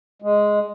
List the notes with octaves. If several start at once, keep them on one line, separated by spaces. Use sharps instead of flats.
G#3